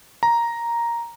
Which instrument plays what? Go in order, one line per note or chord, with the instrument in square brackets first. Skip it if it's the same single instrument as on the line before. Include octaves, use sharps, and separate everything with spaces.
[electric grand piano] A#5